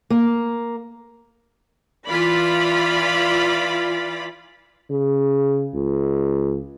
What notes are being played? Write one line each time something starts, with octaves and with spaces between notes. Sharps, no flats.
A#3
E3 F4 D5 B5
C#3
C#2